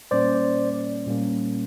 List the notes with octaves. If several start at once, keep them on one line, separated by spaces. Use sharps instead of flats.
A#2 G3 A#3 C#4 C5 D5
A#2 G3 A#3 C#4